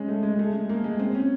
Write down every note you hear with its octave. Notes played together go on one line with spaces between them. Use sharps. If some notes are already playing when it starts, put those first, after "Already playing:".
Already playing: G#3 C#4
A3
G#3
A3
G#3
A#3
G#3
C4
C#4